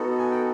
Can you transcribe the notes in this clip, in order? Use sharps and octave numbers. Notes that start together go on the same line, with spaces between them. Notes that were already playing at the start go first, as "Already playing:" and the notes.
Already playing: B3 D#4 F#4 A4
G#5
G5